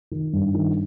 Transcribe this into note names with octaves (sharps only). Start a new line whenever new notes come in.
D#3
G2
D#3